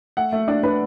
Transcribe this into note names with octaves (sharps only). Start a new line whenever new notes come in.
A3 F#5
A3
D4 D5
D4 B4